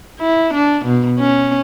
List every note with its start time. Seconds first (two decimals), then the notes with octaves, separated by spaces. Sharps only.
0.20 E4
0.54 D4
0.85 B2
1.19 C#4